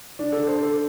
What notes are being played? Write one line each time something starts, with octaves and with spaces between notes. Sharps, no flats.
D4
A4
C5
A4